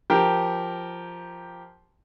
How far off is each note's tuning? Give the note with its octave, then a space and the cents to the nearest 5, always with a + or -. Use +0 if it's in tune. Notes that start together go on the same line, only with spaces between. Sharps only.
F3 +0 G4 +0 A#4 +0